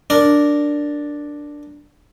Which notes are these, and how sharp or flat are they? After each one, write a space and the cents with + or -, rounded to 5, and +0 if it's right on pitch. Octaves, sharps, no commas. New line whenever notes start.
D4 +0 A#4 -5